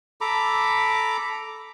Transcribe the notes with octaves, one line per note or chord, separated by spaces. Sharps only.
A4 A#5 B5 D6